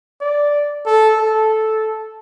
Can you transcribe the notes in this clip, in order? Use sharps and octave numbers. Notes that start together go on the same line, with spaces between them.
D5
A4
A4